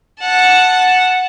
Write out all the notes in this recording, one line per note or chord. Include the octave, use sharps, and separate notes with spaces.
F#5 A5